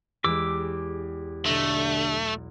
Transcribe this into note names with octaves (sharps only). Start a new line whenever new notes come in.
E2 G#3 G4 D6 E6
B1 D3 A3 A#6 B6